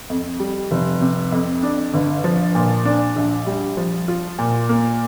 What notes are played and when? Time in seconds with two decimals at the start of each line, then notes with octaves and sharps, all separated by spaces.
0.10 F2
0.40 G3
0.71 F1
1.02 C3
1.32 F2
1.63 D4
1.94 G1
2.24 F3
2.55 A#2
2.85 D4
3.16 A#1
3.47 G3
3.77 F3
4.08 F4
4.39 A#2
4.69 A#3